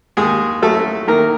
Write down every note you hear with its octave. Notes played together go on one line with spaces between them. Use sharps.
D#2 G#3 G#4
F#3 A3 A4
D#3 A#3 A#4